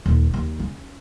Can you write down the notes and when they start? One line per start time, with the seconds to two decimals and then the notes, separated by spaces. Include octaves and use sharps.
0.06 D#1
0.34 D#2
0.60 C#4